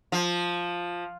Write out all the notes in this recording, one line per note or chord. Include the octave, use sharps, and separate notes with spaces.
F3